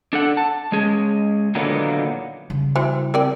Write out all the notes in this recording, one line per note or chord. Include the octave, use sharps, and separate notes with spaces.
D4 A4 F#5
A5
G#3 C#4 G#4
A#2 D3 D#3 F#3 A#3 B3
C#3 G3
E3 F#4 C5 G5
C4 A#4 D5 G5